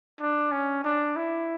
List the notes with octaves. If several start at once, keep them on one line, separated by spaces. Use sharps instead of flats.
D4
C#4
D4
E4